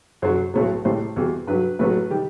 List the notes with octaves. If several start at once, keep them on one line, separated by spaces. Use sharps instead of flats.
F#2 F#3 C5
B1 A2 F#3
A1 A2 G3 C5
E2 B2 G3
G2 F#3 B4
A1 A2 F#3 B4
D#3 G3 G4